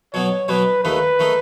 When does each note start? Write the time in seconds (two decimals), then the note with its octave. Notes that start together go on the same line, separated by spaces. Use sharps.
0.14 B2 F#3 B3 C#5
0.48 B2 F#3 B3 B4
0.84 D#2 D#3 A3 D#4 B4
1.19 D#3 A3 D#4